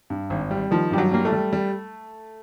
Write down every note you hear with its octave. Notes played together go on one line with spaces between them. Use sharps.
G2
G#1
G3
D#3 F3
G2 G3
F#3
G3 A#3
A3
G3
G3